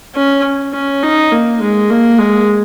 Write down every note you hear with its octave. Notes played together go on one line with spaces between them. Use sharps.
C#4
C#4
D#4
A#3
G#3
A#3
G#3